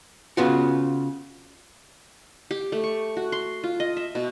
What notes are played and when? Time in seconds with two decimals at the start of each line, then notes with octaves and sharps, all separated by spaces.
0.37 C#3 B3 F4 F#4
2.51 G4
2.72 A3
2.84 C#6
3.17 F#4
3.32 C6
3.64 F4
3.80 D#5
3.97 E5
4.15 B2